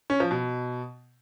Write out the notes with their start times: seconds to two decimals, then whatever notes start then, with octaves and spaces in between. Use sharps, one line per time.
0.10 C#4
0.20 F3
0.31 B2